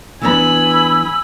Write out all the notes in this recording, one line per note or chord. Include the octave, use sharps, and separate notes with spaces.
E3 B3 D4 G#5 B5 E6